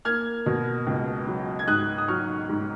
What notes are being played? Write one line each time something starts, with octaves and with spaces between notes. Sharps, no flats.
A#3 F6 G#6
B2
C#2
F#3
G#6
G#2 D#6 F#6
D#6
F#3 C#6 F6
G#2